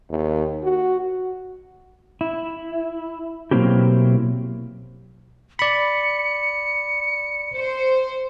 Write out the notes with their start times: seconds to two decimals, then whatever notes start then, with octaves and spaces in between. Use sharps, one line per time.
0.10 D#2
0.63 F#4
2.21 E4
3.51 B2 F#3 A#3 C4 E4 G4
5.59 D5 B5 C#7
7.57 C5